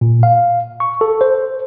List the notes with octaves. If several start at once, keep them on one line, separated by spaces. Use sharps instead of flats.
A#2
F5
C#6
A4
C5